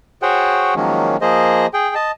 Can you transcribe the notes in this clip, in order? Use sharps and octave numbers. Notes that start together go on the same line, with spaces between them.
F#4 G#4 C5 C#5 F#5 G5
D#3 F3 F#3 G#3 A#3 C#4
F3 A#3 G#4 C5 D#5
G#4 G5
D#5 A5